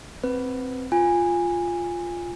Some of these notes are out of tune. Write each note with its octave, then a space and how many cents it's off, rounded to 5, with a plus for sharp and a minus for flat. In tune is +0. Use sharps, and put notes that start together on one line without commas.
C4 +0 B4 +0
F4 +0 G#5 -15